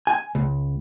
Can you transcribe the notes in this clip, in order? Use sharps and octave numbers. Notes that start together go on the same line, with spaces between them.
G#5
C#2